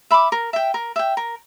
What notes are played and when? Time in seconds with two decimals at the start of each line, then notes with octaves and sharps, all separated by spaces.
0.11 E5 B5 D6
0.32 A#4
0.53 E5 G5
0.74 A#4
0.96 E5 G5
1.17 A#4